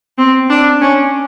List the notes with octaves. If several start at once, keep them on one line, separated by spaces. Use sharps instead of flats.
C4
D4
C#4